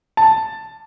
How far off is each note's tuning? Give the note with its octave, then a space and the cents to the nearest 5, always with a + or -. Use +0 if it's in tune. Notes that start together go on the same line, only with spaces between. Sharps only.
A5 +5